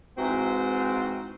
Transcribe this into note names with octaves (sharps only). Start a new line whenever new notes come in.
G#2 E3 C4 F#4